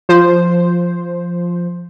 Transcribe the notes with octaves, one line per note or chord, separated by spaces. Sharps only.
F3 C5